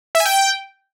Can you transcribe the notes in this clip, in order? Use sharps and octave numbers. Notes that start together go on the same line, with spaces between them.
E5
G#5
G5